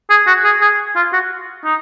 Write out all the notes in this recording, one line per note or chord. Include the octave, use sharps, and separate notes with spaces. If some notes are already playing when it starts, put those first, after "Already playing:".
G#4
F#4
G#4
G#4
F4
F#4
D#4